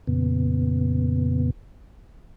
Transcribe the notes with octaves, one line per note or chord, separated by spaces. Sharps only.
F2 A#2 C#3 B3